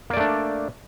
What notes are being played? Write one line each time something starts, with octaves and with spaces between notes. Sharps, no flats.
A3 A#3 D4 D5